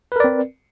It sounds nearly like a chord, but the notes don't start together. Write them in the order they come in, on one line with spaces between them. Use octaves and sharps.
B4 A#4 D5 C4